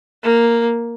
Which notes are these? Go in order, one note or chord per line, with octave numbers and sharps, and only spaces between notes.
A#3